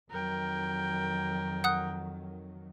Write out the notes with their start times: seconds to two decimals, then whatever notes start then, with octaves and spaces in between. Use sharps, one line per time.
0.10 F2 D#3 F#3 A#4 G5
1.64 F#5 D#6 F#6